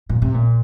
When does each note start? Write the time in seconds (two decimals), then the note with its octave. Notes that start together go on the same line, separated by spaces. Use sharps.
0.09 A#2
0.22 C3
0.34 A#2